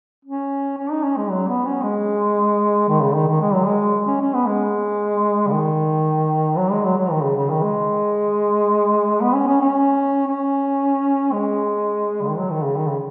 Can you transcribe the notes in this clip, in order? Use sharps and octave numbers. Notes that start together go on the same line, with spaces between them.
C#4
C#4
D#4
C#4
G#3
F#3
B3
C#4
G#3
D#3
C#3
D#3
D#3
G#3
F#3
G#3
C#4
C#4
B3
G#3
C#3
D#3
F#3
G#3
F#3
F#3
D#3
C#3
C#3
D#3
G#3
B3
C#4
C#4
C#4
C#4
G#3
C#3
D#3
F#3
D#3
C#3
D#3
C#3